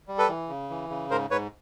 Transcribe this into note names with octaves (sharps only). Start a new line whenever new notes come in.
G3
A4 B4
E3
C#3
E3
C#3
G#2 A#4 C5
G#2 B4 C#5